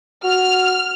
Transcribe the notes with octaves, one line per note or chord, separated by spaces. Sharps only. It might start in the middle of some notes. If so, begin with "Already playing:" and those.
F#4 F6